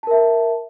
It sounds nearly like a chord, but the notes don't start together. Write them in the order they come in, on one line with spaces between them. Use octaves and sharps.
A5 A#4 E5